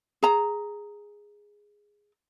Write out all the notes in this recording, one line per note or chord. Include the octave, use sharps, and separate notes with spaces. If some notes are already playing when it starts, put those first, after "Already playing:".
G#4 A#5